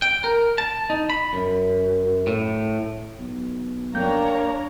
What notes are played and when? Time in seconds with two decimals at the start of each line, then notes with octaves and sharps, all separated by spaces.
0.02 G5
0.24 A#4
0.58 A5
0.90 D#4
1.10 B5
1.33 F#2
2.27 A2
3.19 B1
3.94 F#2 A#3 D4 C#5 G5 A#5